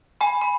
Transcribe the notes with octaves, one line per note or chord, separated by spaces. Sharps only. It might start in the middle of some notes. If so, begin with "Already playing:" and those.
G#5 B5
B5